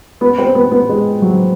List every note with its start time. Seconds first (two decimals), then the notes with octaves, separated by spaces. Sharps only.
0.21 B3
0.38 C4
0.55 B3
0.72 B3
0.89 G#3
1.22 F#3